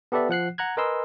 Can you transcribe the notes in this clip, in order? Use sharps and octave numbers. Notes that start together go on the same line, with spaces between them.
B3 G4 A4 B4 D5 E5
F3 F#5 F#6 C7
F#5 A#5 F#6 G#6
A#4 B4 D#5 G#5 C6 E6